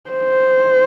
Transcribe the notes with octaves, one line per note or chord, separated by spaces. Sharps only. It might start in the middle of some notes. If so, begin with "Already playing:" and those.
C5